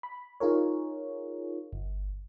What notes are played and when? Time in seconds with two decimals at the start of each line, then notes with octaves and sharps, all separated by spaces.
0.03 B5
0.40 D#4 F4 G#4 A#4 C#5
1.73 G1